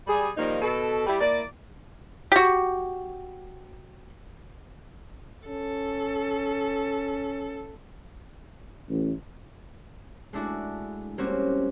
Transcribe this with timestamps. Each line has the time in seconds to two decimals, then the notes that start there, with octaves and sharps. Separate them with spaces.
0.07 G3 G#4
0.37 D#3 F3 G3 A#3 D#4
0.62 B2 A4
1.06 G3 E4 G4
1.21 A#3 E4 D5
2.32 F#4 G4
5.48 C#4 A4
8.89 A1
10.33 G#3 A3 D4 E4 F#4
11.18 G3 A#3 C4 C#4 F#4